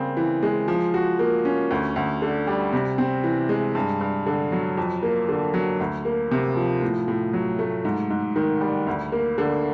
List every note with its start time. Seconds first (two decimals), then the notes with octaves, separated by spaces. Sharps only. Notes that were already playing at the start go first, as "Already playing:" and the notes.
Already playing: C#3 G3 A#3 C4
0.17 E3
0.43 G#3
0.68 F3
0.94 F#4
1.19 A#3
1.45 C#4
1.71 D2
1.96 D2
2.22 D3
2.47 G3
2.73 C3
2.98 C4
3.24 E3
3.49 G#3
3.75 G2
4.01 G2
4.26 D3
4.52 F#3
4.77 F2
5.03 A#3
5.29 D3
5.54 F#3
5.80 D2
6.05 A#3
6.31 C3
6.56 F3
6.82 A2
7.08 A2
7.33 F#3
7.59 A3
7.85 G#2
8.10 G#2
8.36 D#3
8.61 G3
8.87 D2
9.12 A#3
9.38 D3